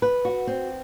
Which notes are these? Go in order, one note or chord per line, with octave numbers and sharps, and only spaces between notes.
B4
F#4
C4